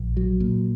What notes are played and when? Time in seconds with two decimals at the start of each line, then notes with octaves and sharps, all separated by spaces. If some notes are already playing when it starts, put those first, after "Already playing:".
Already playing: A#1
0.17 F#3
0.40 A#2